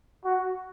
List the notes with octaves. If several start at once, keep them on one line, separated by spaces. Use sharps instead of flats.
F#4